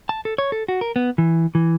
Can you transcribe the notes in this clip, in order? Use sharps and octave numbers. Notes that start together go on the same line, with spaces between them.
A5
A4
C#5
A4
F#4
A#4
B3
E3
E3